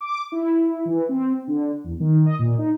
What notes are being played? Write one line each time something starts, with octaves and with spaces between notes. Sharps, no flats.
D6
E4
E3
C4
D3
E2
D#3
D#5
A#2
D#4